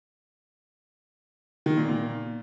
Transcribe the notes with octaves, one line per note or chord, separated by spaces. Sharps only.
D#3
A#2
A#2